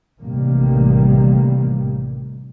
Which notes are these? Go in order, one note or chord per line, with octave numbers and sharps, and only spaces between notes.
A1 C3 D#3 G3 A#3